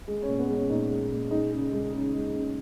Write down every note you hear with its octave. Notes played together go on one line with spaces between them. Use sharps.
G#3
C#4
A#2
B3
G#3 C#4
A#2 D#4
G#3
A#2
G#3 D#4
C#3
G#3
C#3
G#3
C#3